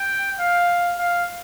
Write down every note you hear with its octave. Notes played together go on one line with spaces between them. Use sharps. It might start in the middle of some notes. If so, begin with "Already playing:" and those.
Already playing: G5
F5
F5